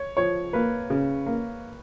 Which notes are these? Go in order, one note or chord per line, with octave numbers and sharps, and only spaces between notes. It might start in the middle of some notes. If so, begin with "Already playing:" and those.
Already playing: C#5
F3 C#5
A#3 B4
C#3
A#3